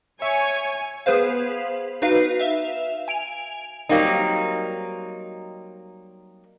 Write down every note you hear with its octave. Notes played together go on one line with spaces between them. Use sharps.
C#5 E5 G#5 C#6
B3 G#4 B4 C5 F5
D#4 F#4 B4 F5 C7
E5 F5
G#5 D7 F7
F#3 G3 A#3 C4 D#4